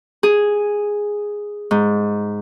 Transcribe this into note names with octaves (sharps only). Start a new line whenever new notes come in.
G#4
G#2